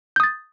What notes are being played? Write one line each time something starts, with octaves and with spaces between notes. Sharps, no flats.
D#6 G6 A6